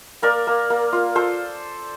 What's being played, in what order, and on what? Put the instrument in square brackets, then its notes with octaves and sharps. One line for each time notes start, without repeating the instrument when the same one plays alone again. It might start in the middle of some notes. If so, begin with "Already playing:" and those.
[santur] A#3 A#4 D5
A#3
A#3
F4
F4 A4 C5